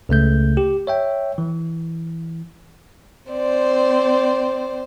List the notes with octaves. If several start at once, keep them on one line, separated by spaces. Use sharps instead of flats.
C#2 C#3 A3 G6
G4
C#5 E5 G5
E3
C4 C5 D5